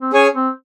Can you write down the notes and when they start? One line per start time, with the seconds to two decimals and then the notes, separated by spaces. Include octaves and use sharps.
0.01 C4
0.13 C#4 G#4 C#5 G#5
0.34 C4